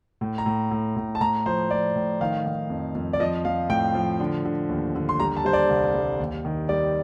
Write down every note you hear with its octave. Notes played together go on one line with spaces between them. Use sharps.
A2
A#5
A2
A2
A2
A5
A2 A#5
F3 C5
F3 D5
A2
D#3 F5
D#3
F2
F2
D5
F3 D#5
F3 F5
A2 G5
F3
D3
D3
D#2
D3
C6
G3 A#5
A5
G3 C5
D5
C2
G3
D#2
D#3
G3 D5